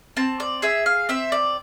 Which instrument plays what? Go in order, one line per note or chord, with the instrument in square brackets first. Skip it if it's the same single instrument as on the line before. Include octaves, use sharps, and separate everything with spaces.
[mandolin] C4 A5
D5
G#4 E5
F5
C4 E5
D5